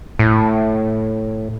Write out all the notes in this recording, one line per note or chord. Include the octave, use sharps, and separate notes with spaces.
A2